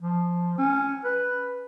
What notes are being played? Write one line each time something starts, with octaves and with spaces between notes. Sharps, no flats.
F3
C#4
B4